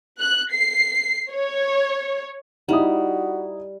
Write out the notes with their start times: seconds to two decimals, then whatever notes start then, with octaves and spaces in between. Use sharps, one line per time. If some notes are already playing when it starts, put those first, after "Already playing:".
0.20 F#6
0.52 C7
1.32 C#5
2.69 G3 D#4 E4 F#4 D#6